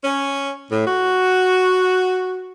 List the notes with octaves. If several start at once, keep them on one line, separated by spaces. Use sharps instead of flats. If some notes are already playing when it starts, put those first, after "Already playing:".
C#4
A2
F#4